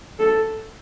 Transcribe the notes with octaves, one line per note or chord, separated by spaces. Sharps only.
A4